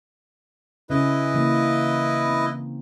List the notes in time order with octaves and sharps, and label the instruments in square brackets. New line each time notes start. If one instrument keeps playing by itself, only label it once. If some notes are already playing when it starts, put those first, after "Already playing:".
[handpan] C#3 C#4 G#4 [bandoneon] E4 B4 D#5
[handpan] C#3 E3 A#3
C4